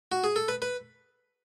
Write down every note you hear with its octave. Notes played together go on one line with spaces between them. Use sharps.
F#4
G#4
A4
B4
B4